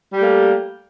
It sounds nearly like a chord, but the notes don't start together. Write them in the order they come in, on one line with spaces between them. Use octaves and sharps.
G3 G4 A3 A#3